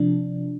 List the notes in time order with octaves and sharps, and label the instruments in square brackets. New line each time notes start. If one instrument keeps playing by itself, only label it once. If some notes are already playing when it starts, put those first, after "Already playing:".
Already playing: [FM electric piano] C3 F3 D4